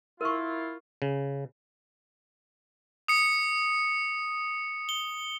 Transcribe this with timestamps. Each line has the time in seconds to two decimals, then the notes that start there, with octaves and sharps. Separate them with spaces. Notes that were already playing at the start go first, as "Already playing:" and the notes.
0.21 E4 F4 A#4 C#6
1.02 C#3
3.08 D#6 C#7
4.89 G7